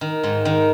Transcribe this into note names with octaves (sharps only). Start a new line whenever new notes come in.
D#3
G#2
D#3